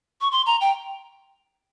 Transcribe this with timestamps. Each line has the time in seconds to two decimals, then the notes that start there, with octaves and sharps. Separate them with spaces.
0.21 C#6
0.31 C6
0.46 A#5
0.61 G5